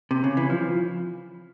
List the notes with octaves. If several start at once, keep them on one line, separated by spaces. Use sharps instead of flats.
C3
C#3
E3
F3